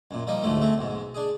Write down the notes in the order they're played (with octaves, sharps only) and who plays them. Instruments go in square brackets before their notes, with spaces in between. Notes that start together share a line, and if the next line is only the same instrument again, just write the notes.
[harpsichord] F#2 A#2
F3 G3 A#3 D#4
D2 G#2 F3 A3 C#4
A3 C4 C#4
B1 G#2
D4 G#4